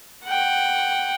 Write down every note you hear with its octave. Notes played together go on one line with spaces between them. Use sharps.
F#5 G5